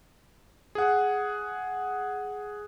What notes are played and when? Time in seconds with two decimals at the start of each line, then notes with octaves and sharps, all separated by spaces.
0.75 G#4 F#5